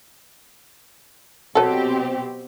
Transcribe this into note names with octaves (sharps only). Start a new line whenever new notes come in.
B2 F#3 C4 G4 A4